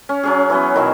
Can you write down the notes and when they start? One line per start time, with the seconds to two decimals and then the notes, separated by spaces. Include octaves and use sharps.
0.09 C#4
0.23 F#3 C#4 G#4
0.50 E3 F#3 B3
0.74 B2 D#3 E4